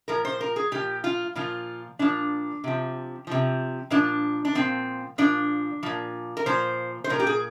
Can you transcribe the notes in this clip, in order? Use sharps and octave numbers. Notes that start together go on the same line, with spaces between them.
A#2 F3 A#4
C5
A#4
G#4
A#2 F3 G4
F4
A#2 F3 F4
A#2 F3 D4
C3 F3
C3 F3
A#2 F3 D4
D4
A#2 F3 C4
A#2 F3 D4
A#2 F3
A#4
A#2 F3 C5
C5
A#2 F3 A#4
G4
G#4